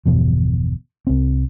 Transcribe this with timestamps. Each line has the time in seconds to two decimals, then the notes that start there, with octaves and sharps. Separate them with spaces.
0.06 G1 E2 B2 F3
1.07 C2 C4